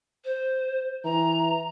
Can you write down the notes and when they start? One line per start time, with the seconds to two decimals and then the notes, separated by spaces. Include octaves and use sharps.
0.25 C5
1.04 E3 A#5